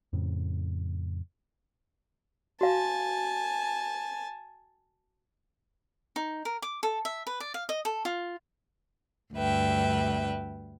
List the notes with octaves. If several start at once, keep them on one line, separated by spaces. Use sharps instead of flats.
F2 A2 C#3
F#4 F5 G#5 A5
D#4
A#4
D6
A4
E5
B4
D5
F5
D#5
A4
F4
D2 G2 B4 E5 G5